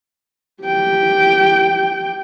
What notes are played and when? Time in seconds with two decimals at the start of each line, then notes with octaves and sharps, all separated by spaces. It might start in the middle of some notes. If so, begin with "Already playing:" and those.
0.63 G4 G5